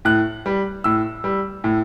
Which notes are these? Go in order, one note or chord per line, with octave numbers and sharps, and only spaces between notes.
A2 F#6
G3
A2 E6
G3
A2